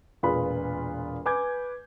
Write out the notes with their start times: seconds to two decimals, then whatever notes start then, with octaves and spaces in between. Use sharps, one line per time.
0.23 E1 A#2 F4 G#4 B4 B5
1.26 B4 G#5 D6 G6 G#6